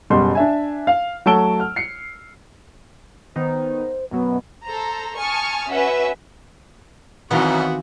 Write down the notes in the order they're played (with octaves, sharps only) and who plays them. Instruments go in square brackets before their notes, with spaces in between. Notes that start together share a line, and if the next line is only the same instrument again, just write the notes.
[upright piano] F#1 B2 G3 C6
D4 E5 G#5
F5
F#3 A3 A5 E6 D7 G7
F6
C7 C#7
[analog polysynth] D#3 B3 D#4 [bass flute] C5
[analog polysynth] F#2 B2 F#3 [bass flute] B3
[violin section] A4 C5 A#5
G#5 A5 C#6 D#6 F6
C#4 F#4 B4 E5 F#5
[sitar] F#2 B2 [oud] D#3 E3 F5 [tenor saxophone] B3 [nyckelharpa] C4 F#4